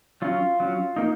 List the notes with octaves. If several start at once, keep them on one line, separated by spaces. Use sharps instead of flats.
F#3 C#4 F4
F#3 C#4
A#3 D#4